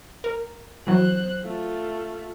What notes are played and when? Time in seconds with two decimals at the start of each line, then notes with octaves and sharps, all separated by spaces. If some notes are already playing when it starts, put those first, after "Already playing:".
0.24 A#4
0.87 E3 F#3 C5 F#6
1.43 A3 F4